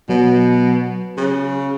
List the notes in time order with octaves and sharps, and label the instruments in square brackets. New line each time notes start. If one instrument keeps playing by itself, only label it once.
[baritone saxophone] B2 [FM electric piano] F#3
[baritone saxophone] C#3